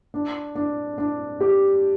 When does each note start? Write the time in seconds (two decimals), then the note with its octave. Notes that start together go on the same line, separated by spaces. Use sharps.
0.14 D4
0.56 D4
0.98 D4
1.40 G4